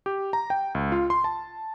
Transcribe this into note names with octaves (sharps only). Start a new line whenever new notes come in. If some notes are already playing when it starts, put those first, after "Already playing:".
G4
A#5
G5
C#2
F4
C6
A5